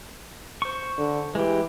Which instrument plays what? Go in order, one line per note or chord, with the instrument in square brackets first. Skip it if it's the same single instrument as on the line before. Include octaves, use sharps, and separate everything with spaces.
[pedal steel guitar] C5 C#6
[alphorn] D3
[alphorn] E3 [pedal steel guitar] G#3 G4